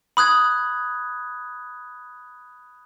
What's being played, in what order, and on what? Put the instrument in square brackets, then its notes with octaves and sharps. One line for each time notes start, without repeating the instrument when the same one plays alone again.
[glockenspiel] B5 D#6 F#6 G#6